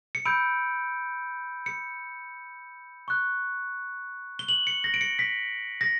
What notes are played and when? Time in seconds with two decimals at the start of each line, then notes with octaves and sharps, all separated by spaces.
0.15 C#7
0.25 B5 E6 G6 D7
1.66 C#7
3.08 C#6 F#6
4.39 G7
4.49 F#7
4.67 C#7
4.84 A#6
4.94 D7
5.01 C#7
5.19 B6
5.81 A#6